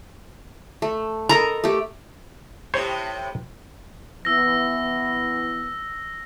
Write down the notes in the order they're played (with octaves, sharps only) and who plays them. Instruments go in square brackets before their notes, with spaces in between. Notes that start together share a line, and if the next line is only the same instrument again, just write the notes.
[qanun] A3
[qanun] A4 A#4 D#5 [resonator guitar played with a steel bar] A#5
[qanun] A3 G4
[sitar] A2 C3 [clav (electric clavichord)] C5 C#5
[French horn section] E3 B3 [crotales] E6 A#6